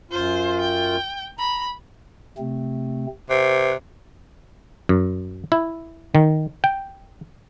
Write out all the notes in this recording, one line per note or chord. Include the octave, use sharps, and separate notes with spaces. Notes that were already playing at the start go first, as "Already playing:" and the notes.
F#2 F4 C5
G5
A#5 B5
C3 A3 C4
C3 B4
F#2
E4
D#3
G5